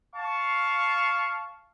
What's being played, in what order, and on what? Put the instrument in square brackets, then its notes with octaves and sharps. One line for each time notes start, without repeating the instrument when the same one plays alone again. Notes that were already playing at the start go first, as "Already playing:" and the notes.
[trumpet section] F5 A5 C#6